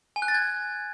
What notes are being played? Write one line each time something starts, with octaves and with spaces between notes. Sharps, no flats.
G#5
F#6
A6
G#6